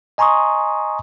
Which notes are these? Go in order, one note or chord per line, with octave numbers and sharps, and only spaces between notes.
D#5 G#5 A#5 C6 C#6 D#6